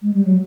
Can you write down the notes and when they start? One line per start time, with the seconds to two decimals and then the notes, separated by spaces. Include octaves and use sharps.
0.02 G#3
0.14 G3
0.25 F#3